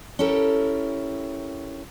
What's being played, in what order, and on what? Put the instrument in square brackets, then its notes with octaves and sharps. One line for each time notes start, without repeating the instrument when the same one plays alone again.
[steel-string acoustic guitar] C#4 E4 G4 A4 A#4